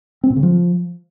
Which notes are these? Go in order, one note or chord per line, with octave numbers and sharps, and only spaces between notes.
C4
A#2
C#3
F3